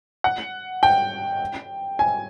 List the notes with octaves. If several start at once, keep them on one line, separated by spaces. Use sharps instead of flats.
F#5
G5
G#5